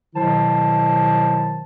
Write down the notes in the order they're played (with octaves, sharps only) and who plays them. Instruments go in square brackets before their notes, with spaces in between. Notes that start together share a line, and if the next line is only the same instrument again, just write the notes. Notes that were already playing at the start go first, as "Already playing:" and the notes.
[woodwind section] B2 D#3 F#3 E4 C5 A5